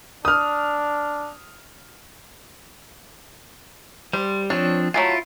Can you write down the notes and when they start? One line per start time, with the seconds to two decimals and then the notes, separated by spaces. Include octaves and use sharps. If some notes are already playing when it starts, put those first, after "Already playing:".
0.25 D4 D#6 F6
4.13 G3 C5
4.50 F3 C4 D4 C#5
4.94 F#3 A3 E4 F4 G#5